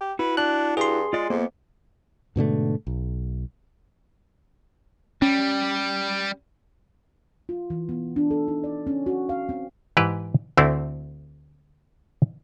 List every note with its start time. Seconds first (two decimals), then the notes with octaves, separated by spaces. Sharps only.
0.01 G4
0.19 E4 F#4 B4
0.37 D4 F#6
0.77 G2 G#4 C6
1.13 G#3 F4 D5
1.30 F2 A#3 B3
2.36 G#2 B2 D3 A3
2.87 B1
5.22 G3 C#4
7.49 F4
7.70 E3
7.89 B3
8.16 D4
8.31 A4
8.48 D#4
8.64 D5
8.87 C#4
9.06 F#4
9.29 F5
9.49 C4
9.97 G#2 E3 G4 B4
10.57 D2 D3 A3 C4 E4